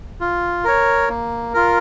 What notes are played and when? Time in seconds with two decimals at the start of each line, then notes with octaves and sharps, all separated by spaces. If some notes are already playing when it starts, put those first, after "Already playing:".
0.21 F4
0.64 A#4 C#5
1.09 A#3
1.54 F4 A#4